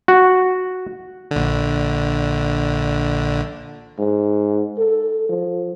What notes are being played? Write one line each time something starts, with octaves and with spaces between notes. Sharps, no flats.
F#4
A#1 D3
G#2
A4
F3